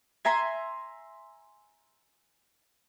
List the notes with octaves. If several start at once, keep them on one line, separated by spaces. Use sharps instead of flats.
E5 G#5 A#5 C6